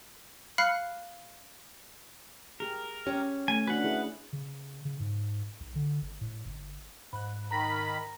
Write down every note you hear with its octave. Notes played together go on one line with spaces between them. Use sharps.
F5 B5 F6 F#6 C7 C#7
G4 G#4 A#4
C#4 G4
A3 G#5
D4 F#4 B4 F#5
E4 G#4
C#3
C#3
G#2
B1
D3
G1
A2
G1
G#2 B5 F#6
D#3 A#5 B5 A#6